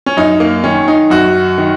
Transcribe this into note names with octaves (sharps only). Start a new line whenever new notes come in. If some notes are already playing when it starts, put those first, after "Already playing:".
C#4
F#2 D#4
A#3
D#3 C#4
D#4
F#2 F#4
D#3